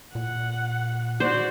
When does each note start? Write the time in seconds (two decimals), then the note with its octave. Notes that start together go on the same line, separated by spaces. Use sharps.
0.15 A#2 F#5
1.20 F#4 C5 D5